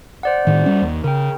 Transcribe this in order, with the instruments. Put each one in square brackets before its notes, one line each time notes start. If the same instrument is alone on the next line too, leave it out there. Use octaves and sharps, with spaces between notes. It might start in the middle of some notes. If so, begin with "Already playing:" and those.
[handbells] C5 D5 F#5
[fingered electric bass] A2 D#3
G3 C#4
D#2
[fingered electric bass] C#3 [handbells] A#4 G5